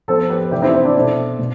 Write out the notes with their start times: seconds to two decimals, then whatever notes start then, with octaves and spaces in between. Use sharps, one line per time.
0.08 A2 F3 B3 A4 C5
0.30 G4 B4
0.51 C3 E3 A3 E4 G4
0.62 C4 E4
0.74 C4
0.85 D4
0.96 B2 A3 C4
1.39 B2